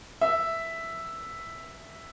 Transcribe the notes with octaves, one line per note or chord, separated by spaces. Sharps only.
E5